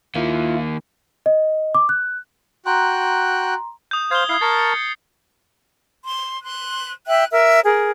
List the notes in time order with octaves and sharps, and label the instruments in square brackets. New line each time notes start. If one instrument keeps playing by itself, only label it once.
[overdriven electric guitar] D#3 A#3 [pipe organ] E4 F4
[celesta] D#5
D6
F#6
[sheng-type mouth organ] F#4 G5 F#6 [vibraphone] A#5 C6
[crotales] D#6 G6
[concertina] C5 F5 [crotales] G#6 G7
[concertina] E4 F5 [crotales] D#6 G#6 C7
[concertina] A#4 A5 C#6 [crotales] A6
[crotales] C#7
[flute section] C6
C6 F#6
E5 G5 F#6
A#4 E5
G#4 A#4